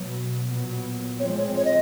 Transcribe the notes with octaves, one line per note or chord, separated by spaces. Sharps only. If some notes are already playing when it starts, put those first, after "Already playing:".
Already playing: B2 F#3 B3
A#2 F#3 B3
A2 F3 G#3 C4 C#5
C#5
C#5
D#5